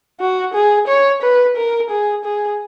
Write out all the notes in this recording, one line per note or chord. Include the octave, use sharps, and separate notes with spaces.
F#4
G#4
C#5
B4
A#4
G#4
G#4